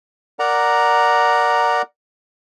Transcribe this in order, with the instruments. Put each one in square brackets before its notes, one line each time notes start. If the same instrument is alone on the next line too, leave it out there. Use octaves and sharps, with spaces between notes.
[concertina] A#4 D5 F#5 A#5